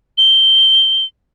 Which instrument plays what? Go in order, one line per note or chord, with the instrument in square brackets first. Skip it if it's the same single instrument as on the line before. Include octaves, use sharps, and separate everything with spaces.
[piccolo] G7